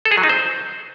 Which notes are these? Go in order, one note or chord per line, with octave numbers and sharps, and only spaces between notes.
A4
G#4
F#3
D#4
C5